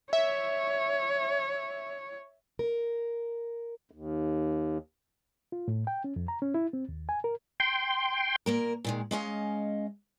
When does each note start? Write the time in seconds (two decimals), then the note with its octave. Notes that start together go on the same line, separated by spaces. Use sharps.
0.13 C#5 E5
2.59 A#4
3.91 D#2
5.52 F4
5.68 A2
5.87 G5
6.04 C#4
6.16 F2
6.28 A#5
6.42 C#4
6.54 E4
6.73 C4
6.89 D#2
7.09 G#5
7.24 A#4
7.60 G5 C6
8.46 A#2 A#3 A#4
8.84 A#2 D#3 G#3
9.11 G#3 C#4 D#5 F5